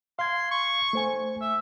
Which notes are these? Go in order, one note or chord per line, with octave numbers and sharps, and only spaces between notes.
F5 C6 G#6
C#6
A3 C5 G#5
E5